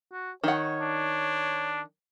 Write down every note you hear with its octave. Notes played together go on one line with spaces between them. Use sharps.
F#4
D#3 C#5 F#5
D4